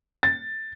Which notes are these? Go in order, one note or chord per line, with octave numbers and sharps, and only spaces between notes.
A6